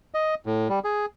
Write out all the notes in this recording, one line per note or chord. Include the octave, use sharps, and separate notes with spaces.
D#5
A2
G3
G#4